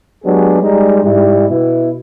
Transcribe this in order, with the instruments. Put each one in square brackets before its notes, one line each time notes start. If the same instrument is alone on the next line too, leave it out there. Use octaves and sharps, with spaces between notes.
[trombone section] F#3 G#3 B3 D4 G4 G#4
G3 G#3 D#4
G#2 G3 E4
B2 E4